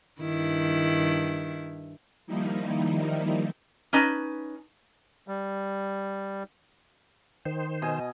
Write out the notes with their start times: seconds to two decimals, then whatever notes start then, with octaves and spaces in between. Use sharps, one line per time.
0.21 G2 D#3 E4
2.27 D#3 F3 G3 A#3 D#4 E4
3.93 C#4 D#4 B4 A5
5.28 G3
7.46 D#3 C5
7.82 B2 D#5 G#5